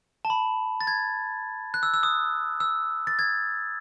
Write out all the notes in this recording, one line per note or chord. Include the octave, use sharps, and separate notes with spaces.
A5
B5
A6
G#6
F#6
E6
E6
D#6
E6
A6
G#6